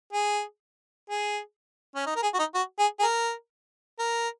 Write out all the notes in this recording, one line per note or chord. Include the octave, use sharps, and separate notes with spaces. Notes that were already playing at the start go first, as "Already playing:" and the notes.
G#4
G#4
C#4
D#4
A#4
G#4
F#4
D#4
F#4
G#4
G#4
A#4
A#4